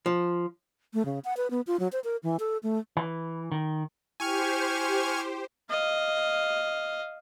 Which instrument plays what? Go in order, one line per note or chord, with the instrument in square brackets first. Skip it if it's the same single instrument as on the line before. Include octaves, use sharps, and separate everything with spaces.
[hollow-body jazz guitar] F3
[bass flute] A3
C#3
F#5
B4
B3
F4
F#3
C5
A#4
E3
A4
A3
[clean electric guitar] E3
D#3
[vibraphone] E4 G5 [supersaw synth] G4 C5 [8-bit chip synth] G#5 C#6 F6
[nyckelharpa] D#5 F5